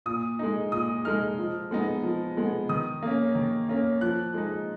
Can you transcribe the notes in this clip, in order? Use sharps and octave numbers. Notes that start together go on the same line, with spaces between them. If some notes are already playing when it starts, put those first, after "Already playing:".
A#2 D#6
G#3 D#4
A#2 D#6
G#3 D#4 F6
F3
G#3 B3 D#4
F3
G#3 B3 D#4
D#3 D#6
A#3 C#4
D#3
A#3 C#4
F3 F#6
G#3 D#4